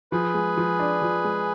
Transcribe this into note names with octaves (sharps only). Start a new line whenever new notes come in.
F3 G#4 B4
G#3
F3
D4
F3
G#3